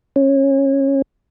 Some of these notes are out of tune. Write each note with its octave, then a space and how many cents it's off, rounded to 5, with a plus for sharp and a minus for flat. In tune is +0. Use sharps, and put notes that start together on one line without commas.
C#4 -20